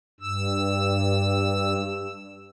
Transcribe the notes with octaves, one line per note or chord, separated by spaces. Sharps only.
G2 E6